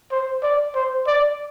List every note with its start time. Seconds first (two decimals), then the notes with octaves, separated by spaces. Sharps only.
0.12 C5
0.43 D5
0.75 C5
1.07 D5